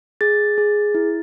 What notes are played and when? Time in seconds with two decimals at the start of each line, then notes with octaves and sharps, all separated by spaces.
0.21 G#4 A6
0.58 G#4
0.95 E4